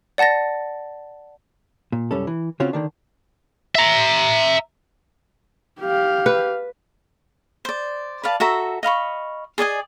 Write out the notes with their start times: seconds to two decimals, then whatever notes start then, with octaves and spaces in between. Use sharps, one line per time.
0.18 D5 F#5 A5 A6 A#6
1.92 A#2
2.11 C2 F#2 G3 C#4 A4
2.27 E3
2.60 C#3 C4 C#4 F4 F#4
2.73 D3 D#3 D4
3.75 E5 A#5
5.80 G4 F5
6.26 B4
7.65 C5 D5
8.23 B4 D5 F5 A5
8.40 F#4 A4 E5 A#5
8.83 D#5 F5 B5 C#6
9.58 G#4 D5 D#5 G#5